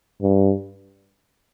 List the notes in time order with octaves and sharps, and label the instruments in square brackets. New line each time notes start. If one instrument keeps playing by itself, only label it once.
[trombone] G2